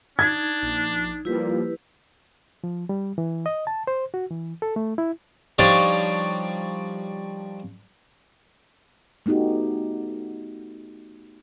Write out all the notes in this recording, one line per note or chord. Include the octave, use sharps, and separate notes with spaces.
D4 D#4 G#6
A#1
F3 G3 A#3 E4 G4 B4
F3
G3
E3
D#5
A5
C5
F#4
E3
A4
A3
E4
F3 G3 D4 D#4 C#5 D5
A3 B3 D#4 F#4 G4